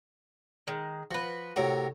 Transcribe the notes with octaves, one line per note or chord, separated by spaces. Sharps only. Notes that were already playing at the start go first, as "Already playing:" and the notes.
D#3 G#3
F3 F#4 B4
A2 C3 F#4 A#4 C#5